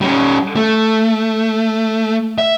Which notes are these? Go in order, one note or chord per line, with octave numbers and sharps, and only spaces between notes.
G3 C#4
A3
E5